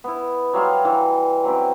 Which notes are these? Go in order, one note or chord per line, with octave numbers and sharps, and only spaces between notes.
B3 E4
F#3 G3 F5 C6
E3
F#3 C4 C#4 E4